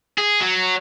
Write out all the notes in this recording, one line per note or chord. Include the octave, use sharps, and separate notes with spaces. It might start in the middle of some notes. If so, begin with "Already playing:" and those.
G#4
F#3